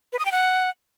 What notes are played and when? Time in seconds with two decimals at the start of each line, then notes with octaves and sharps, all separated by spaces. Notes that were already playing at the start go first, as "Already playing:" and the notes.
0.13 B4
0.19 D#6
0.25 G5
0.32 F#5